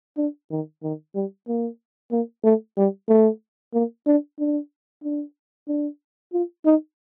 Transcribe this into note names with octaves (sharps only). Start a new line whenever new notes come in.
D4
D#3
D#3
G3
A#3
A#3
A3
G3
A3
A#3
D4
D4
D4
D4
F4
D#4